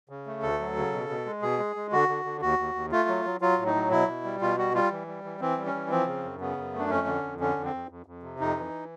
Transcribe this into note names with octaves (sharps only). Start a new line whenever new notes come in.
C#3
A3
D2 A4
F#3
C#3
B2
B2
G#3
B2 G#4
G#3
G#3
D3 F#4
D3
D3
D#2 F#4
D#2
D#2
A3 F4
F#3
F#3
F#3 F4
A2
D#4
F#3
B2 E4
B2
G3
B2 F4
G3 F#4
G3 F4
E3
G3
E3
E3 C4
G3
C#4
E3
F3 C4
C#3
F#2
C#3 B3
F#2
A3
D4
F2 C#4
D3
F2
D3 C#4
F2
C4
F2
F2
F2
C3
F2 D#4
E3